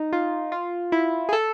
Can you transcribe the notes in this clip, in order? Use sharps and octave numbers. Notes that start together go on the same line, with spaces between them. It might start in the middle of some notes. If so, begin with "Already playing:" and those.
Already playing: D#4
F4
F4
E4
G#4
A4